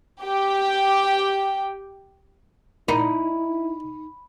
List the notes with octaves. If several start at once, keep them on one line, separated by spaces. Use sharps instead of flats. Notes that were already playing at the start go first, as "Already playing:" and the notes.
G4 G5
A#2 D#4 E4 B5